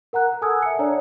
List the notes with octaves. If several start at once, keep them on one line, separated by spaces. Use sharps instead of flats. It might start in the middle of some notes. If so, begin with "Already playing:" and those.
A#4 F#5 A#5 F#6
A4 G#5 A5 D#6 E6 G#6
E5 C#7
D4 C#5 D5 A#5